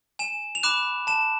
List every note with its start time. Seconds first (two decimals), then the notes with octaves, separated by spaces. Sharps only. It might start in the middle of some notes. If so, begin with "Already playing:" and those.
0.19 G#5 E7
0.55 F7
0.63 B5 D6 F#6 E7
1.07 A5 E7